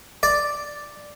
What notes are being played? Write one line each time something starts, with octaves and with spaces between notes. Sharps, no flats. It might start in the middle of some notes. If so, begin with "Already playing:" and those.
D5